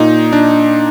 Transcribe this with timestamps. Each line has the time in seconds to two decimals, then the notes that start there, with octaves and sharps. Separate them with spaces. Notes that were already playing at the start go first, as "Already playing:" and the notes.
Already playing: A#2 D#4
0.33 D4